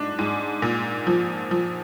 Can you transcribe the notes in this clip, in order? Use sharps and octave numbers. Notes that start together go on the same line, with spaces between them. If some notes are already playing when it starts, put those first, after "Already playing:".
Already playing: G#2 D4
G#2
A#2
F3
F3